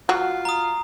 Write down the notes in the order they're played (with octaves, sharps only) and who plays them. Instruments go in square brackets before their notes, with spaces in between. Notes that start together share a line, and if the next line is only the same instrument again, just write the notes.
[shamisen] F#3 F#4 [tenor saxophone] F4
[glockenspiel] A#5 D#6